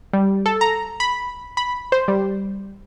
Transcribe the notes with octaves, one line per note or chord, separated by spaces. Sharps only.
G3
A4
A#5
B5
B5
C5
G3